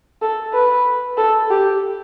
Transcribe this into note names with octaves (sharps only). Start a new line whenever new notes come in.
A4
B4
A4
G4